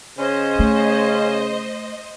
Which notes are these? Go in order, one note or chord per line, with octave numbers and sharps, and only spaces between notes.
C#3 C#4 C5 D#5
A3